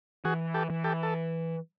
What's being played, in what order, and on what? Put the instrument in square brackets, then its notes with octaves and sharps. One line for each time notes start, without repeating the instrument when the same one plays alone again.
[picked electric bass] E3 [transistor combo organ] F#4 G#4
[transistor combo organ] G4 A4
[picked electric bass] E3
[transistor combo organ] G4 A4
A4